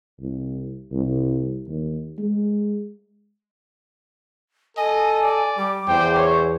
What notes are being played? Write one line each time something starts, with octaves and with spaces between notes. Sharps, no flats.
C2
C2
D#2
G#3
A4 D#5 G#5
D5
G3 D6
E2 C5 G5
C#5